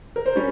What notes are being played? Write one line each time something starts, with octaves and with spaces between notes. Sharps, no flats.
A#4
C5
G3 C#4 C#5